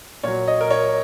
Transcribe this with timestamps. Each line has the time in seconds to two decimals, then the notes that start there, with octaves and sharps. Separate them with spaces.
0.23 A#2 F#3 C#5
0.48 D#5
0.61 A#4
0.71 C#5